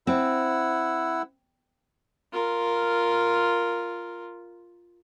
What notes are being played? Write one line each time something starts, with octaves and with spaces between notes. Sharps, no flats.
C4 E4 F#5 E6
F4 A#4